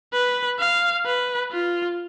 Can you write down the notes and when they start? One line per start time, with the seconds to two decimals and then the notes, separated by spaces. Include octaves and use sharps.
0.13 B4
0.59 F5
1.05 B4
1.51 F4